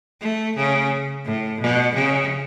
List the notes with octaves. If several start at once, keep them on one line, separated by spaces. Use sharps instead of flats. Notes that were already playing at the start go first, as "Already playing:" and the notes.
A3
C#3
A2
B2
C#3